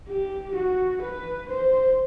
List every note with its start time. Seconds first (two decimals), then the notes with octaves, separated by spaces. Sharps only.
0.09 G4
0.56 F#4
1.02 B4
1.49 C5